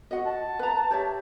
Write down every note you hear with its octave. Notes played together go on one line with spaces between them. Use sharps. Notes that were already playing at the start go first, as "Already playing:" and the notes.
F#4 D#5 F#5
A5
B4 A#5
G4 C#5 E5